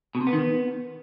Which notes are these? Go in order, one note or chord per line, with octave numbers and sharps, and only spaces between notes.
B2
C3
B3
D#3
B3